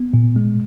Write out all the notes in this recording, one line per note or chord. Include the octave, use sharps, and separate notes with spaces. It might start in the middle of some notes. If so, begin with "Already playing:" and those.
Already playing: B3
A#2
G#3